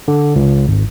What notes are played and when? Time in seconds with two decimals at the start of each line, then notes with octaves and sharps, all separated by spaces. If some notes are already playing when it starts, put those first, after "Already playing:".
0.08 D3
0.36 C#2
0.68 G#1